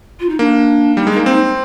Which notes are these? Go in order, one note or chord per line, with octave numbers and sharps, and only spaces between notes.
F4
D#4
A#3 D4
G3 D#4
G#3 D#4
A#3
C4 D#4